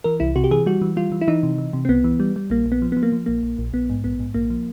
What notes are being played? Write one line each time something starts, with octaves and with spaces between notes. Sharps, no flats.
E3 A#4
C2 E4
C3 F#4
G4
E3 G#4
G3 F#4
E3
G3 F4
E3
E4
E3 D#4
C3
E3
C3
C4
C2 B3
E3
G3
G3
A#1 A#3
A#1
B3
F3
F3 B3
A#3
F3
A#1 A#3
A#1
A#1
A#1 B3
G#2
A#1 B3
G#2
A#1 A#3
F3